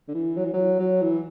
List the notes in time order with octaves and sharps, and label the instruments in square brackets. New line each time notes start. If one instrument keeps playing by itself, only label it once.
[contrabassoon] D3
E3
F#3
E3
F#3
F#3
E3